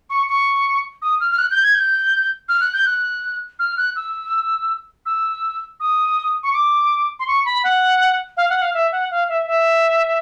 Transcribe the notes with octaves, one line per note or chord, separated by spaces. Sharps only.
C#6
C#6
D#6
F6
F6
F#6
G6
G#6
G6
F6
F#6
G6
F#6
F6
F#6
E6
E6
D#6
C#6
D6
C6
C#6
B5
F#5
F5
F#5
F5
E5
F#5
F5
E5
E5